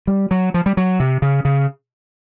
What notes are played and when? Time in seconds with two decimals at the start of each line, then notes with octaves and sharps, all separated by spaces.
0.07 G3
0.31 F#3
0.54 F3
0.66 G3
0.77 F#3
1.00 C3
1.22 C#3
1.45 C#3